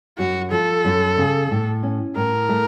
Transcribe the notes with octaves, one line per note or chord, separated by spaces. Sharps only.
F#2 F#4
F3 A4
F#2
C#3
A2
C#4
A2 A#4
A3